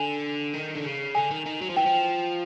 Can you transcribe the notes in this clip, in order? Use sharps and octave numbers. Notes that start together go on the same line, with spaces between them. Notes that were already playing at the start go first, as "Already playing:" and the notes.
Already playing: D3 G#5
D#3
D3
C#3
D3 G#5
D#3
D#3
F#3
F3
E3 G5
F3